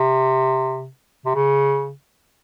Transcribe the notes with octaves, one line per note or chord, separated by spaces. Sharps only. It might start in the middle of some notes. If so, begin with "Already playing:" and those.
Already playing: C3
C3
C#3